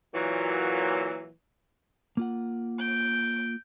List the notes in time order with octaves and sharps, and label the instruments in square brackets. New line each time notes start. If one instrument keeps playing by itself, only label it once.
[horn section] A#2 E3 F#3
[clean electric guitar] A#3 F4 F#5
[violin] G6 D7